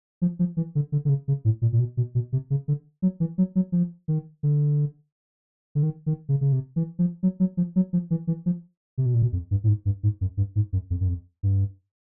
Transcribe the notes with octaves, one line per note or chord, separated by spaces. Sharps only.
F3
F3
E3
D3
D3
D3
C#3
C#3
A2
A#2
A#2
B2
B2
B2
C3
C#3
D3
F#3
E3
F#3
F#3
F3
D#3
D3
D3
D#3
D#3
C#3
C#3
C3
E3
F3
F#3
F#3
F3
F#3
F3
E3
E3
F3
C3
B2
A#2
B2
F2
G2
A2
G#2
G2
G#2
F#2
G2
G#2
F#2
F2
F#2
F2
G2